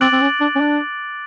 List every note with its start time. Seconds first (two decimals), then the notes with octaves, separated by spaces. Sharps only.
0.01 C4 D6 F#6 A6 D7 F#7
0.12 C4
0.21 C#4
0.41 D4
0.55 C#4
0.61 D4